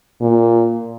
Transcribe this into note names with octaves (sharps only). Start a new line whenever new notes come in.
A#2